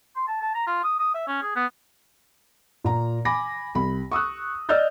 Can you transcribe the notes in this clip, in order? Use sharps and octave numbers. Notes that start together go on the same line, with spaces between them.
C6
A5
A5
A#5
F4
D#6
D#6
E5
C#4
G#4
B3
A#2 A#5
G#5 B5 D6 A#6
C2 B5
C#6 D#6 E6 F#6
D5 D#5 E6 F6 G6 A6